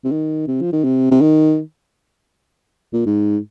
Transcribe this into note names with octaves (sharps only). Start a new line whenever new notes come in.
C3
D#3
C3
F3
D#3
C3
C3
D#3
A#2
G#2